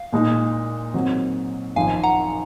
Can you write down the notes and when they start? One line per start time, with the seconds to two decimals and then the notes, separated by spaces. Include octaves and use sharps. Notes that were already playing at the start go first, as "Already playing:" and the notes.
Already playing: F5
0.13 A#2 G#3 D#4
0.94 G#2 D#3 F#3 C4
1.76 G#1 F#2 F3 F5 G#5
2.03 F#5 A#5